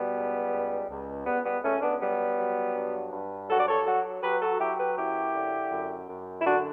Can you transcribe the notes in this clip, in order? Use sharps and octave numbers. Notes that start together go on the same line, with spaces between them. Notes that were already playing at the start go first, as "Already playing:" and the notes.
Already playing: B2 G3 B3
C#2
C#2
C#2
C#2 G3 B3
G3 B3
C#2 A3 C#4
B3 D4
F#3 G3 B3
F#3
G2
G2
F#3 F#4 A4
D5
A4 C#5
F#3 F#4 A4
F#3 G4 B4
F#4 A4
F#3 E4 G4
G4 B4
F#2 E4 G4
D3
F#2
F#2
E4
D3 D4 F#4